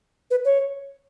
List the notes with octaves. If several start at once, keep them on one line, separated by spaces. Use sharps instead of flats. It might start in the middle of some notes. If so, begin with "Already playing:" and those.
B4
C#5